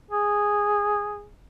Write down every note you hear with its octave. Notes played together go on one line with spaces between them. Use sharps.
G#4